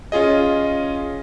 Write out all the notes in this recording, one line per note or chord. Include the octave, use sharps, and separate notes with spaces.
C#4 F4 G#4 D#5